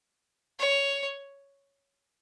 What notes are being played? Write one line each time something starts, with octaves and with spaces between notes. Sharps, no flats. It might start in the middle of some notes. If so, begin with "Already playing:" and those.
C#5